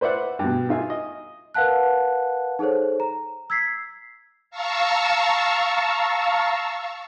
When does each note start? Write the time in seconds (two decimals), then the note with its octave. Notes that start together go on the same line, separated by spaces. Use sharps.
0.01 B4 C5 D5 E5 F#5
0.39 G2 B2
0.69 D#4 F4 E5 G#5
0.90 D#5
1.54 A#4 B4 F5 F#5 A5 F#6
2.59 D#4 G#4 A4 C5 C#5
3.00 A#5
3.50 E6 G#6 B6 C7
4.50 F5 A5 A#5 C#6 E6